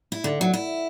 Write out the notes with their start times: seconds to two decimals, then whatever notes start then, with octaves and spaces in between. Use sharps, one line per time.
0.12 E4
0.24 D3
0.41 F#3
0.54 E4